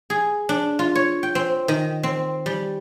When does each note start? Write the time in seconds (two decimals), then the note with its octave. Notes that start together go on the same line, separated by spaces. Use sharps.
0.10 G#4
0.49 D4
0.79 F4
0.95 C#5
1.23 G5
1.35 C4
1.68 D#3
2.03 C4
2.46 G3